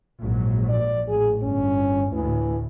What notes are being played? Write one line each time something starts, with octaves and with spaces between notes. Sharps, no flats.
A#1 G#2 F#3
D5
A1 G#4
G1 C#4
D2 A2 E3